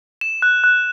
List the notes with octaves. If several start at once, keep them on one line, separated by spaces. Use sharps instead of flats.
E7
F#6
F#6